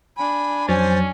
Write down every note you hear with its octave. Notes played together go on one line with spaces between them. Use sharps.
D4 G#5 B5
F2 F#3 C#4 C5 A6